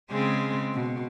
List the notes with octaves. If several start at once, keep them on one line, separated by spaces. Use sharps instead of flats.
C#3 G#3 C4
B2